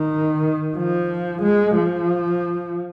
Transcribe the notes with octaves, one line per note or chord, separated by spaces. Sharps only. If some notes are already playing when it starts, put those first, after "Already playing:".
Already playing: D#3
F3
G#3
F3